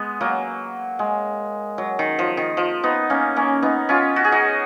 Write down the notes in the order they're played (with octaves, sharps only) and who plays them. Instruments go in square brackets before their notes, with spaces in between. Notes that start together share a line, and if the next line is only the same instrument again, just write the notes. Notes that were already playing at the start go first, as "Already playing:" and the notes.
Already playing: [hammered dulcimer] G#3 B3
F#3 A#3
G#3
F#3
D#3
F3
D#3
F3
B3 D#4
A#3 C#4
A#3 C#4
B3 D#4
C#4 F4
F#4
G#4
D#4 F#4